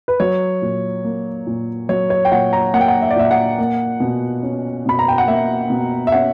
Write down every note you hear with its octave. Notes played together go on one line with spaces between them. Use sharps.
B4
F#3 C#5
A#2
A#3
A#2
F#3 C#5
C#5
G5
A#2 F#5
A#5
A#3 F#5
G5
F#5
E5
D5
A#2 E5
F#5
A#3
B2
C#4
B2 B5
A#5
G5
F#5
A#3 E5
B2
E5
C#4 F#5